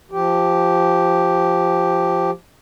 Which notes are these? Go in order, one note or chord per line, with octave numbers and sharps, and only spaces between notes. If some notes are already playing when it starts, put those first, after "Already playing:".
F3 G4